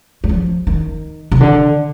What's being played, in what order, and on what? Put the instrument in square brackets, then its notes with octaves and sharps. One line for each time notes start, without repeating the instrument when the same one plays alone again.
[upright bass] G3
F3
D#3
C3
D3